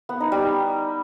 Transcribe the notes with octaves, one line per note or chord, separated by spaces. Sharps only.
B3
D#4
G3